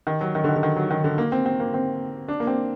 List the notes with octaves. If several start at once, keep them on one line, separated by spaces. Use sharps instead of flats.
D#3
F#3
D#3
D3
D#3
D3
D#3
F#3
D#3
D3
A#3
C4
C4
A#3
C4
D4
A#3
C4